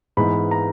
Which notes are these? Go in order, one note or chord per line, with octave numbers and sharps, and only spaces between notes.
G#2 E3 G#3 B3 B5
A#5